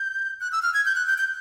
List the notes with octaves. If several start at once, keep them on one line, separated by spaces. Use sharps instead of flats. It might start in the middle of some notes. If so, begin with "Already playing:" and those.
Already playing: G6
F#6
E6
F6
G#6
G6
F#6
G6
G6